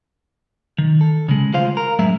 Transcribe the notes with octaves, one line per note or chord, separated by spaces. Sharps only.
D#3
A4
C#3 G#3
D2 G#3 F4 C5 F5
A#4
F#2 A2 G#3 E5